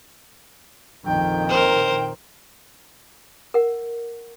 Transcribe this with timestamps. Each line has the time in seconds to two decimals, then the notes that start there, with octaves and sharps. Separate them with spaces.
1.05 A#1 F2 D#3 G5
1.49 A#4 C5
3.54 A#4 F#5